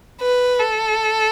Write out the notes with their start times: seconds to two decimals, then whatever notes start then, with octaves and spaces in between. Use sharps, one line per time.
0.21 B4
0.59 A4